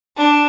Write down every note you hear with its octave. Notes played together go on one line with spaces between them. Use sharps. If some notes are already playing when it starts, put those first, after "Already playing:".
D4